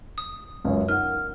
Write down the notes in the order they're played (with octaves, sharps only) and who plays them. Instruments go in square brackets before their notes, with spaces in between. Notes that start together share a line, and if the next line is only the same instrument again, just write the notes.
[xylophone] D#6
[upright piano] C#2 F#2 C#5
[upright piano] D#4 F#5 [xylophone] A#4 F6